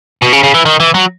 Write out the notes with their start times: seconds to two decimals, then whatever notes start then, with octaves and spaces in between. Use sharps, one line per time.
0.22 B2
0.33 C#3
0.43 C#3
0.54 E3
0.65 D#3
0.80 E3
0.94 F#3